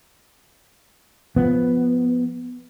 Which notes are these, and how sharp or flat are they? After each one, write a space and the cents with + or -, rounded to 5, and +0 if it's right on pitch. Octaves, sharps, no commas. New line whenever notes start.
F3 +0 B3 +0